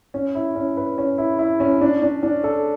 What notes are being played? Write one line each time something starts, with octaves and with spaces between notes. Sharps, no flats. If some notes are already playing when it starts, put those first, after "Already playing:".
C#4
E4
C#4
B4
C#4
E4
E4
C#4
D4
D4
D4
A4